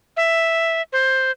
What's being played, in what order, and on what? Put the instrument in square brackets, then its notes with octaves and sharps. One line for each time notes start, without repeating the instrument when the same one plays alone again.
[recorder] E5
C5